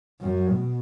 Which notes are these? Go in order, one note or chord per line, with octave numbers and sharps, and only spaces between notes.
F#2
B2